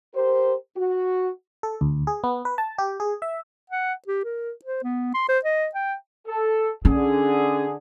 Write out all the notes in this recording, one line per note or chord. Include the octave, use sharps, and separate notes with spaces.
G4 A#4 C5
F#4
A4
D2
G#4
B3
B4
A5
G4
G#4
E5
F#5
G4
A#4
C5
B3
C6
C5
D#5
G5
A4
D3 C#4 G#4